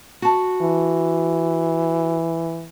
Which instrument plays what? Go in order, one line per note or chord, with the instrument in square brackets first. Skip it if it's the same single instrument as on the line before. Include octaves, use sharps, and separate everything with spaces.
[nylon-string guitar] F#4 A5
[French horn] E3